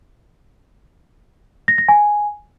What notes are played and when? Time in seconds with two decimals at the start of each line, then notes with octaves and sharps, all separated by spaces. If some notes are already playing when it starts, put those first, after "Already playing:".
1.68 A#6
1.78 A#6
1.88 G#5